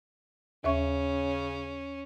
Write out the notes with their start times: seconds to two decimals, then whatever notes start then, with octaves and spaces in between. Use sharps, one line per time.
0.64 D#2 C#3 C#4 E5 C#6